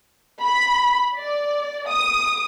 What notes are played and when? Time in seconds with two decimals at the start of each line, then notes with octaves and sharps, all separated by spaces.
0.42 B5
1.16 D5
1.87 D#6